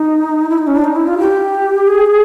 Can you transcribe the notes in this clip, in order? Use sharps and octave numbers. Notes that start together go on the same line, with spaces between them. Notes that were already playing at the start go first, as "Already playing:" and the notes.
Already playing: D#4
E4
D#4
C#4
D4
D#4
E4
F4
G4
G#4